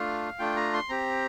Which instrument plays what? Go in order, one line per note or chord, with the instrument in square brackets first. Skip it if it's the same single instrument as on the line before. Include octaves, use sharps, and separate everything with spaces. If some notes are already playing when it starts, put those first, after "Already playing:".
Already playing: [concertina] A3 D4 F4 F5
A3 D4 F4 G5
A#5
C6
C4 G4 A#5